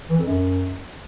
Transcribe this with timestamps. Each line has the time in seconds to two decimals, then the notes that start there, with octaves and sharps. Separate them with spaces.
0.10 E3
0.18 F2
0.27 F#2